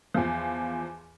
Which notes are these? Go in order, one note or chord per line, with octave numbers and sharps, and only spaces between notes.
E2 F3